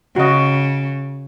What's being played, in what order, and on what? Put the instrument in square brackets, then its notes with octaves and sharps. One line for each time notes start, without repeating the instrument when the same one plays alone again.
[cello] C#3 [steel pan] F#4 D#5